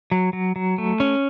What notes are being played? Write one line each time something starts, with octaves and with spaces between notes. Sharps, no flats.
F#3
F#3
F#3
A3
C#4